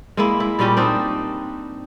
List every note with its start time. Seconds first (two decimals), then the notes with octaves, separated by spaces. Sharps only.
0.17 G#3 A#3 E4
0.40 E4
0.59 A#2 G3 C#4 G4
0.77 C4 D4 D#4